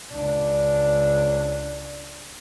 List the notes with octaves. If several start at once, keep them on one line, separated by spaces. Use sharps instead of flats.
C#2 D4